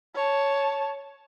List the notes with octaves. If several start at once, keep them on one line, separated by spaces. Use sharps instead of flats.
C#5 A5